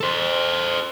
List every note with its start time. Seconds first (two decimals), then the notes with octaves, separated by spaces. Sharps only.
0.01 A4 C5